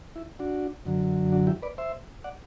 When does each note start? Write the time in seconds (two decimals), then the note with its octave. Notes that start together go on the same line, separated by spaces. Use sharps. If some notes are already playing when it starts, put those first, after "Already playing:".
0.16 E4
0.39 D4 F#4
0.85 F#2 D3 F#3
1.32 D4 F#4
1.47 E4 G4
1.62 B4 D5
1.78 C5 E5
2.24 D5 F#5